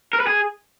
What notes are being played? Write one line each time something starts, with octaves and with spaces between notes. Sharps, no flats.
A#4
B4
G#4